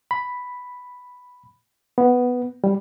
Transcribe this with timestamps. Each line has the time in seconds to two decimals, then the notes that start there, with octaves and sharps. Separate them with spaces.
0.11 B5
1.98 B3
2.64 G3